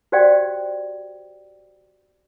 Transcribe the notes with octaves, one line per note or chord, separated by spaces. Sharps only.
F#4 G4 C5 D5 F5 G5